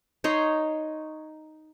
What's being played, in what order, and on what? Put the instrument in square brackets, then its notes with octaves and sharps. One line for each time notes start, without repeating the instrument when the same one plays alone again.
[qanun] D#4 C#5 C6